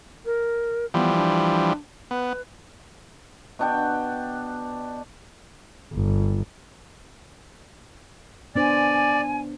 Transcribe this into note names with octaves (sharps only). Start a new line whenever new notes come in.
A#4
E3 F3 G3 B3
D4
B3 B4
B2 D4 G5
G1
B3 D4 C5 D5 G#5